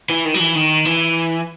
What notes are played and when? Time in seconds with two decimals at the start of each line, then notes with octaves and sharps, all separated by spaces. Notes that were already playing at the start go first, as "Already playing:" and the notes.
0.10 E3
0.25 D#3
0.34 F#3
0.40 E3
0.55 D#3
0.85 E3